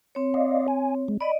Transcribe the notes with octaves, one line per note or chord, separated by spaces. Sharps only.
C4 C#5
D5 D#5 F5
G#5
G#3
D5 D#5 B5